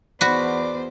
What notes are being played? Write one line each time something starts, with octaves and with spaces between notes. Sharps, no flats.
E2 F#4 B4 C5 D5